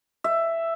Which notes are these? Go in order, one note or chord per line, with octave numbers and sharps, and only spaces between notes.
E5